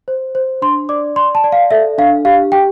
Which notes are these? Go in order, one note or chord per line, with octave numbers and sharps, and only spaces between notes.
C5
C5
D4 C6
D5 D6
D5 C6
A5
D5
F5
A4 E5
D4 F5
G4 F5
G4 G5